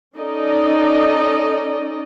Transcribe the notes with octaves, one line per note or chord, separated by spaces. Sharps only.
C#4 D#4 A4 D5 D#5